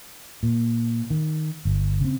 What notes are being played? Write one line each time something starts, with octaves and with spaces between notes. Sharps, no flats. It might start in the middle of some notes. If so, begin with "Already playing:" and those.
A#2
D#3
G1
C#3 C4